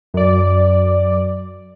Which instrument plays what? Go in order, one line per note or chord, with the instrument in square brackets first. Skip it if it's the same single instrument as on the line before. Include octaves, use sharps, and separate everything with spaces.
[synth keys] F#2 D5